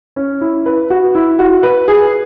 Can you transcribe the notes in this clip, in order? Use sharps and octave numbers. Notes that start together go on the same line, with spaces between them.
C#4
E4
B4
F#4
E4
F#4
B4
G#4